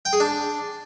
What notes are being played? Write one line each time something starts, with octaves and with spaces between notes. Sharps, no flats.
G5
G#4
D4